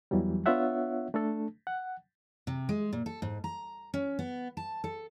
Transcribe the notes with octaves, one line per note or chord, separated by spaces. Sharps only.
E2 E3 F#3 G3
B3 D4 F4 C#5 E5 F#5
A3 D4 A4
F#5
C3
G#3
A#2
A4
G#2
A#5
C#4
B3
A5
A4